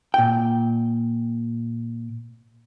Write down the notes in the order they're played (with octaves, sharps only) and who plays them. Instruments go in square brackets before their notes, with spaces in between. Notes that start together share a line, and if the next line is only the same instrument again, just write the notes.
[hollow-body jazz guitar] A#2 G5